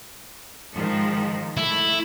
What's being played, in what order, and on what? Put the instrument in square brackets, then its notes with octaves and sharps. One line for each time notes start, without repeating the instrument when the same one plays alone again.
[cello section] G#2 D#3 F3
[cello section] A3 [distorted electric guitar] E4